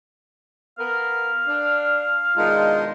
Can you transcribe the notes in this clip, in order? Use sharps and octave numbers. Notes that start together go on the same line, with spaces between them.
B3 A#4 F5
D4
B2 D#3 G#3 D4 D#4 F4